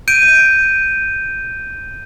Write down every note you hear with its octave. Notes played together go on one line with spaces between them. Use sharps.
G6 D7 D#7